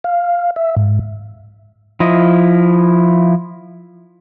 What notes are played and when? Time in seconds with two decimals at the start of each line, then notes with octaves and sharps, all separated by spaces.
0.04 F5
0.56 E5
0.77 G#2
2.00 F3 E4 D#5